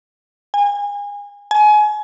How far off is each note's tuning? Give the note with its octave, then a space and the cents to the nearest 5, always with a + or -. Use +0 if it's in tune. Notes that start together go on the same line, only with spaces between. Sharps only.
G#5 -30
G#5 +30